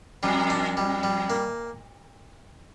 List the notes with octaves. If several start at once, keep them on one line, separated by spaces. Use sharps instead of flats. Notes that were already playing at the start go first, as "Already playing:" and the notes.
F2 G3
D4
G3
G3
A#3